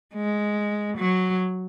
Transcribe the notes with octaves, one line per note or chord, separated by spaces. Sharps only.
G#3
F#3